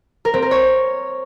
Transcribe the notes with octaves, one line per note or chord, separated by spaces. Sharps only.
A#4
C4
A#4
C#5